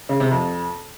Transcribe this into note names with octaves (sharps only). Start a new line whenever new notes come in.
C#3
C3
F2